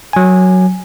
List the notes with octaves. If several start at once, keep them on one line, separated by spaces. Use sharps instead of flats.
F#3 G#5